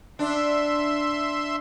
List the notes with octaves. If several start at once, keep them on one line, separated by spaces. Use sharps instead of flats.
D4 E5 C6